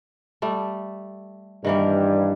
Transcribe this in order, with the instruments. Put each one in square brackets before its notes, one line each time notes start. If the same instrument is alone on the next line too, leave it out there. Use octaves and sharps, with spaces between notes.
[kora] G3 A3
[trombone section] G2 [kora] D#3 E3 A#3